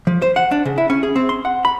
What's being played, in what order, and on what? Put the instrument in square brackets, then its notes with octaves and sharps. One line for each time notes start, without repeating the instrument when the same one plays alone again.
[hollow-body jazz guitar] F3
C5
F#5
D4
C#3
E4
C#4
G#4
C4
C6
F#5
B5